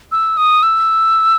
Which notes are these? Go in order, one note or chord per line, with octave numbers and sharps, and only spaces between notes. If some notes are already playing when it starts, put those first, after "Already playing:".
E6
D#6
E6